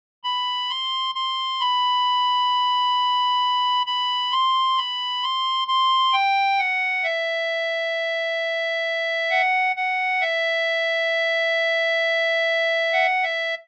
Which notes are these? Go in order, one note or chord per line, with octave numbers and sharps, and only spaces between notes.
B5
C6
C6
B5
B5
C6
B5
C6
C6
G5
F#5
E5
F#5
F#5
E5
F#5
E5